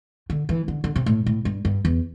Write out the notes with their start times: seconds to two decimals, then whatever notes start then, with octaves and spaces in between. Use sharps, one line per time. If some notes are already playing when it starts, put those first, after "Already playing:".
0.30 D3
0.49 E3
0.68 D3
0.84 D3
0.96 C3
1.06 A2
1.26 A2
1.45 G2
1.65 G2
1.85 E2